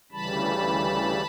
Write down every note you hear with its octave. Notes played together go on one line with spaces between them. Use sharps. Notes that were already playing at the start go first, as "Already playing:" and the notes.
D2 C#3 E3 G3 A5 B5